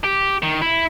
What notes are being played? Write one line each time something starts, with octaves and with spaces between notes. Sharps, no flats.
G4
D#3
E4